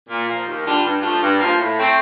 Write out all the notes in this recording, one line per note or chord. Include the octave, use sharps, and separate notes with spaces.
A#2
F3 A#3
D#2
D3 G3 D4 F4
G2
F3 A3 D4 F4
G2
F3 A#3
A2
A3 C4